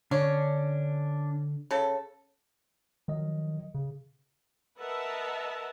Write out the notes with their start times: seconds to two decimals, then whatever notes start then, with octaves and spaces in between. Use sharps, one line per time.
0.11 D3 C#4 D4
1.71 C#3 A4
3.08 D#3 F3 F#3 D#5
3.75 C#3
4.79 A#4 B4 D#5 E5 F#5 A5